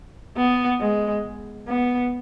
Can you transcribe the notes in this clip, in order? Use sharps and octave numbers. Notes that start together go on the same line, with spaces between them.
B3
G#3
B3